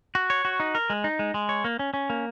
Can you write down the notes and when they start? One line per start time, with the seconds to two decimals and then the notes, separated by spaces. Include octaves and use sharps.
0.15 F#4
0.30 C#5
0.45 F#4
0.60 D#4
0.75 A#4
0.90 G#3
1.04 D#4
1.19 G#3
1.34 G#3
1.49 C#5
1.64 A#3
1.79 C#4
1.94 C#4
2.10 A#3